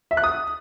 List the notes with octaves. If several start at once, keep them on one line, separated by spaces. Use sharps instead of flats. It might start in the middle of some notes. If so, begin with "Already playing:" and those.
E5
F#6
D#6